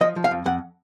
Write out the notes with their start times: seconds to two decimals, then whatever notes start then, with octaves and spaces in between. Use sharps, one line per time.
0.01 F3 D#5
0.16 F3
0.24 F5
0.31 F2
0.46 F2 F#5